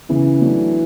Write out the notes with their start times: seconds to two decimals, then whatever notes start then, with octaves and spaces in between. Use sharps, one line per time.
0.09 C#3 E3
0.41 F#3 A3 D4